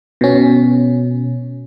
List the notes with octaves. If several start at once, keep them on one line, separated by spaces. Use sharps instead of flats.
B2 C#4